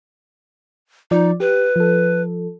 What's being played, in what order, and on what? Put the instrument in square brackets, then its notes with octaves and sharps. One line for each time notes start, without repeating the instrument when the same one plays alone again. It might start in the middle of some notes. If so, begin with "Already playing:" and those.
[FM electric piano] F3 D5 [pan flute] D#4
[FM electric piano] G4 [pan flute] B4
[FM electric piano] F3 A4